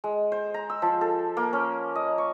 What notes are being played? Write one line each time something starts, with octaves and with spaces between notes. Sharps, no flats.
G#3
C5
A#5
E6
F3
A4
A#3
C#4
D#5
C#6